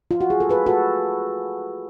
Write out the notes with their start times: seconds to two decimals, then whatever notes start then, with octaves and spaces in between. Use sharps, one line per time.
0.11 F4
0.21 F#4
0.30 G#4
0.40 A4
0.49 G#4 B4
0.66 F#4 A4